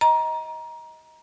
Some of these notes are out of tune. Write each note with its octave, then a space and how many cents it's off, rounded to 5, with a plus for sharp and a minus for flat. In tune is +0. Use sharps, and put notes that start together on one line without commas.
D#5 +20 A#5 +20